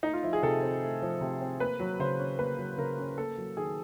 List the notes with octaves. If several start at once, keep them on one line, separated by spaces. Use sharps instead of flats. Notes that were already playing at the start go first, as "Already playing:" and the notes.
A3 D#4
F4
F3 E4
G#4
C3 A4
C4
A3
F3
C3
C4
A#3 B4
F#3
C#3 C5
C#4
A#3 B4
F#3
C#3 A#4
C#4
A#3 A4
F#3
D#3 G#4